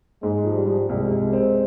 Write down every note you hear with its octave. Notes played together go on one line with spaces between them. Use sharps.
G#2 G#3
F3
G3
F3
C2 G#3
C2
C4